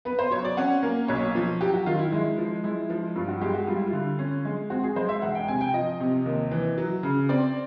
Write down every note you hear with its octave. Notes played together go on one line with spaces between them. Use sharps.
B3 B4
C5
F#3 C#5
D5
C#4 F#5
A#3
B1 C#5
F3
F#3 G4
F#4
D#3 F4
E4
G#3
F3
G#3 E4
F3
G2 F4
F#4
G#3 G4
F#4
G3 F4
E4
F4
D3
C#4
G#3
C4 F#4
G#4
G#3 C5
E5
E1 F#5
G5
C3 G#5
G5
F3 D#5
C3
D#2
E3
F#3
C#3
C4 D5